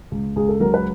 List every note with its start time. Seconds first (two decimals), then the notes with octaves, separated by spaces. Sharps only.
0.11 C#2
0.36 C#2 G#4
0.49 A4
0.60 F#3 A#4
0.74 B4